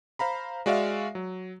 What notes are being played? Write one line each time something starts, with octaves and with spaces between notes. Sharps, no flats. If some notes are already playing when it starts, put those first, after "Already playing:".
C5 F5 A#5 B5
G#3 F#4 D5 E5 F5
F#3